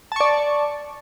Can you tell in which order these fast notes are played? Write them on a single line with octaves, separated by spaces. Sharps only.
A5 C#6 D5